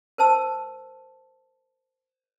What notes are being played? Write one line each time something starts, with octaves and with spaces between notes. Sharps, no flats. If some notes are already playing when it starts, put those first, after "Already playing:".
A#4 C5 A5 E6